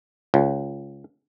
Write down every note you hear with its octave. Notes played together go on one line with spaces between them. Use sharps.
C#2